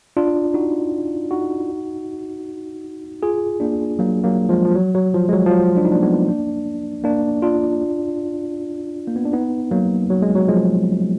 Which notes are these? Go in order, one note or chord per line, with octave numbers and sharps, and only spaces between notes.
D4 F4
D#4 F#4
D#4 F#4
F4 G#4
A#3 D4
F#3 A#3
F#3 A#3
F3 G#3
F3
F#3
F#3
F3
G#3
F#3
F3
F#3
D4
D#4
A#3 D4
G#3 B3
A#3 D4
A#3 D4
D4 F4
A#3
B3
D4
B3 D#4
F#3 A#3
F#3
G#3
F#3
F3 G#3